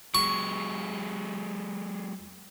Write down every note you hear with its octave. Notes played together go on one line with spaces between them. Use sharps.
F#3 G#3 C#6